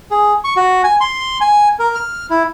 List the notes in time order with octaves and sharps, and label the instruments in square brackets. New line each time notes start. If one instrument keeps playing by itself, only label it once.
[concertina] G#4
C#6
F#4
G#5
C6
G#5
A#4
F6
E4